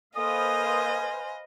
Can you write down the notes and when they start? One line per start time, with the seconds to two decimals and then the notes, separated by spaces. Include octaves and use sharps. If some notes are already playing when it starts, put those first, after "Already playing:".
0.17 A#3 A4 B4 C5 D#5 F5 G#5 D#6